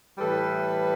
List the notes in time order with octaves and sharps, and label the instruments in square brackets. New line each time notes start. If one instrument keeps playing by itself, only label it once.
[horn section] A2 E3 G3 A4 B4